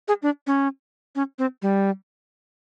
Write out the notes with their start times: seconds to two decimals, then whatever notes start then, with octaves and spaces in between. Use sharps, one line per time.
0.08 G#4
0.23 D4
0.47 C#4
1.16 C#4
1.39 C4
1.62 G3